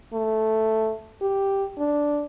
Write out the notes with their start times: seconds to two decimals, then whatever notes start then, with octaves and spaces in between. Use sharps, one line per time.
0.14 A3
1.22 G4
1.79 D4